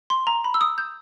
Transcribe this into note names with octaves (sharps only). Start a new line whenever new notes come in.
C6
A#5
B5
E6
D#6
G6